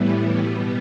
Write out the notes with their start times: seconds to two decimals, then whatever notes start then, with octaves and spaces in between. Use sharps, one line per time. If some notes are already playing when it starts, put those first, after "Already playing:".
Already playing: A2 E3 G3 B3
0.38 B2 G3 B3